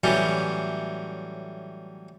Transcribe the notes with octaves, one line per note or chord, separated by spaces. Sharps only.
A2 E3 F#3 G3 C#4